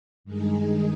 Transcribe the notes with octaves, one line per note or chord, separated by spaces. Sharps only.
G2 D#3 G#3 D#4 G#4